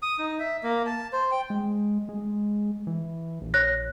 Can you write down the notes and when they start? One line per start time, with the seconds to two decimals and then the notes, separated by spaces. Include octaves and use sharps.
0.02 D#6
0.19 D#4
0.39 E5
0.63 A#3
0.86 A5
1.13 C5
1.31 G5
1.50 G#3
2.09 G#3
2.87 E3
3.41 A#1
3.54 C#5 F#6 A#6